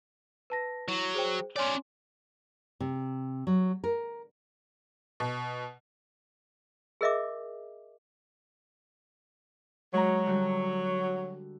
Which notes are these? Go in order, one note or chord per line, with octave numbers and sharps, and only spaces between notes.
B4 A5 A#6
F#3 E4
G#4 C5 G5
C#4 C#5 D5 G#5 C6
C3
F#3
A#4
B2
G#4 A#4 D#5 E5 D6
F#3 G#3 A#5
D3 G3 F#4